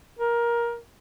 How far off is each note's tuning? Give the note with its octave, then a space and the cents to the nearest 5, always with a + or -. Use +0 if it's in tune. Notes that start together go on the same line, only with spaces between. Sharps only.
A#4 +15